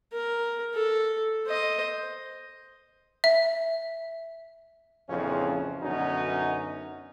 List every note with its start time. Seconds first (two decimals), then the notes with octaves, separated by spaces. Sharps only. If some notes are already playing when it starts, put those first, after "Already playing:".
0.13 A#4
0.74 A4
1.47 C5 D#5
3.24 E5
5.10 A#1 F2 C#3 E3 F3 C#4
5.83 F#2 B2 D3 C#4 D#4 F#4